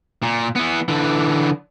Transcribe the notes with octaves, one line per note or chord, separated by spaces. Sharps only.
A#2
E3 B3
D3 E3